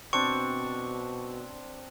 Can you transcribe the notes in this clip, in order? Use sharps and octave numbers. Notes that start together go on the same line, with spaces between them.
B2 C4 D4 C#6